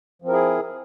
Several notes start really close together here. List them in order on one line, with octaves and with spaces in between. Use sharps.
F3 C4 A#4 E4 G#4